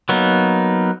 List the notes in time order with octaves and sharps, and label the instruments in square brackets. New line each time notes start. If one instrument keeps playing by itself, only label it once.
[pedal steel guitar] F#3 A#3 B3 D#4